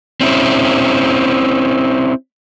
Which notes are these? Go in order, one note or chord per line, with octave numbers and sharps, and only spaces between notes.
C4 C#4 E4